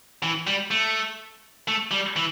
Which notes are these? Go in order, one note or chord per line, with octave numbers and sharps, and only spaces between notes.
E3
G3
A3
A3
G3
E3